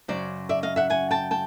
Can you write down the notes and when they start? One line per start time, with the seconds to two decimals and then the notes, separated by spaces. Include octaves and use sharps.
0.08 F#2 C#3 F#3 C5 D5
0.49 D5 E5
0.63 D#5 F5
0.76 E5 F#5
0.90 F#5 G#5
1.11 G5 A5
1.31 G5 A5